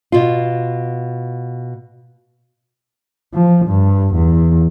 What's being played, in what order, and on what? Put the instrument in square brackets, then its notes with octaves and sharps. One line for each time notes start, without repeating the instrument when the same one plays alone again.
[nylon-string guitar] B2 F4
[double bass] F3
G2
E2